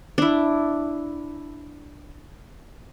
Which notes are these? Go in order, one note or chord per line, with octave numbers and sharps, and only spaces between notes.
D4 E4